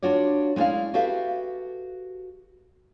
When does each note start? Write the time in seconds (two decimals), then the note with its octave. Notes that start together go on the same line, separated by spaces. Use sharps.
0.02 D4 F4 F#4 C#5 D5
0.56 G#3 B3 C#4 E4 D5 F5
0.94 F#4 G4 A4 B4 E5 F5